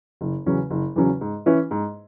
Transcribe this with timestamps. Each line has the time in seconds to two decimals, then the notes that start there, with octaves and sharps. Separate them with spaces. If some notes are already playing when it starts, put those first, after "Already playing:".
0.21 F#1
0.46 E2 C#3 F#3 C#4
0.70 F#1
0.96 E2 C#3 F#3 C#4
1.21 G#2
1.46 E3 C#4 E4 B4
1.71 G#2